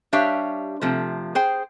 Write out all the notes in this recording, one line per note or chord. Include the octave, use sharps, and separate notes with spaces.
G3 D4 G4 C#5 E5 F5
C3 F3 A3
G#4 C5 G5